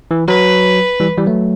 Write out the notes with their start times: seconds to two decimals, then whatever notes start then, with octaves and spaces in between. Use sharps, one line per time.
0.11 E3
0.28 F#3 B4
1.00 E3 G3
1.18 E3 G3
1.26 F#3 A3